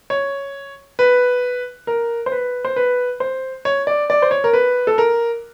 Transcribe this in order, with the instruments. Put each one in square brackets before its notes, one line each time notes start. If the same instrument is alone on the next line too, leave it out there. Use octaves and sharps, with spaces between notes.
[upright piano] C#5
B4
A#4
C5
B4
C5
B4
C5
C#5
D5
D5
C5
C#5
A#4
B4
A4
A#4